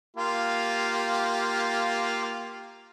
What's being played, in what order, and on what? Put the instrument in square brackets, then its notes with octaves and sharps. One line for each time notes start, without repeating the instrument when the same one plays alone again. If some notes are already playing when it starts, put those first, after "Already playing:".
[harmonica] A#3 F4 G4